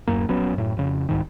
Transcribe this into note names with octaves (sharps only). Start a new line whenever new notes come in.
D1 C2 F#2 A#3
A#1 F#3 B3 C#4
F#2 A2
F2 C#3
C2 G#2 D#3